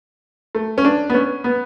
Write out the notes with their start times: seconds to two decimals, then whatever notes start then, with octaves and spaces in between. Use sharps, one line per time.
0.55 A3
0.78 C#4
0.85 D4
1.10 B3
1.14 C#4
1.44 B3